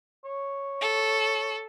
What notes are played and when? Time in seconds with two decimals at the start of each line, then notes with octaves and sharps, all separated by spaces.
0.25 C#5
0.81 A4